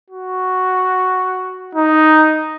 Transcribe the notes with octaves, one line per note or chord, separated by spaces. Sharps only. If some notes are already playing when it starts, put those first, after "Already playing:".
F#4
D#4